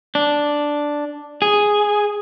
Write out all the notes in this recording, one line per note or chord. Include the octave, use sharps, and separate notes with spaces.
D4
G#4